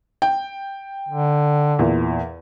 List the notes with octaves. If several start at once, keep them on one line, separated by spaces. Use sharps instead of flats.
G5
D3
E2 A#2